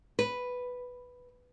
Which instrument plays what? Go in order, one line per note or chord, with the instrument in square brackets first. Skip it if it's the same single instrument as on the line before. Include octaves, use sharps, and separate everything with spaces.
[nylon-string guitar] B4